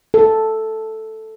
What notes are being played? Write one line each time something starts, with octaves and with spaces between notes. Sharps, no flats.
A4